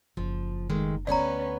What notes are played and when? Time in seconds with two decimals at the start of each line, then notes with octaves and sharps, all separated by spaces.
0.17 F#1 F3
0.70 D#3 G#3 A3
1.07 D2 B3 C#4 B4 D5 A#5